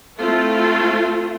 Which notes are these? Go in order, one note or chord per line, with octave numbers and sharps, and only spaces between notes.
A3 C4 E4 F4 A4